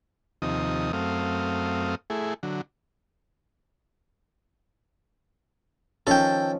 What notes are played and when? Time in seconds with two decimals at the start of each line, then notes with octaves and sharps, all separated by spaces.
0.42 D#2 C3 F3 D#4 D#6
0.93 F#2 A3 C4 F5 D#6
2.10 A3 E4 G#4
2.43 D3 F#3
6.07 D#3 F3 C#4 A4 G5